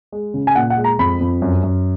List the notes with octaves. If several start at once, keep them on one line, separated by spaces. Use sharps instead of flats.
G#3
C#3
G#5
A#2 F#5
F#5
G#3
A#5
F2 B5
F2
F#2
F#2